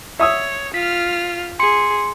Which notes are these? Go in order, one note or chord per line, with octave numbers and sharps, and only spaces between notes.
C#5 E5 D#6 E6
F4 F6 B6
G#4 C6 C#7